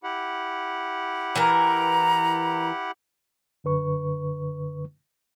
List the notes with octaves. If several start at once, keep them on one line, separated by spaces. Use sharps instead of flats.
E4 G4 F#5
E3 A#4 A#5
F#2 D3 B4 C#6